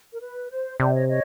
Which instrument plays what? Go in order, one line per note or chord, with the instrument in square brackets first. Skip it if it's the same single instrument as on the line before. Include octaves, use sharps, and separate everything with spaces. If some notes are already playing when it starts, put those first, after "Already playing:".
[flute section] A#4
B4
C5
[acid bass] C3 [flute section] C5 D5
[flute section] C#5 D#5
C#5 D#5